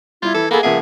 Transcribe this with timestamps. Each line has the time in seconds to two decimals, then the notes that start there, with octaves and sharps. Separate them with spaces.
0.23 G3 E4 F4 G#6
0.34 E3 A4
0.51 A#3 G#4 A4 F#5 B5
0.63 C#2 F3 A#3 G#4 E5 F#5